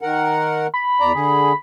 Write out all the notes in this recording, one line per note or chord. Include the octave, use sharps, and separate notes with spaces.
D#3 A#4 F#5
B5
E2 D5 A#5
D3 G#4